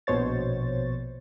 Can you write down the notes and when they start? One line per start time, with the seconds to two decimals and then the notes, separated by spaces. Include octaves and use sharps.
0.07 A#1 B2 C5 C#5 A6